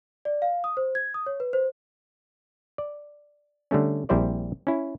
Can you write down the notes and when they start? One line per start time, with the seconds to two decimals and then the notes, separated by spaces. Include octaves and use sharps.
0.25 D5
0.42 F5
0.64 D#6
0.77 C5
0.95 G#6
1.14 D#6
1.26 C#5
1.40 B4
1.53 C5
2.78 D5
3.71 D3 G3 A3 C#4
4.09 A#1 G3 C4 E4 C5 D5
4.67 C#4 E4